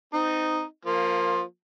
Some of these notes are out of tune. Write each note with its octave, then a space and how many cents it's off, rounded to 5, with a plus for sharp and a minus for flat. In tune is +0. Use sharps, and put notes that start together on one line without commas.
C4 -30 D#4 +0
F3 +15 A#3 -5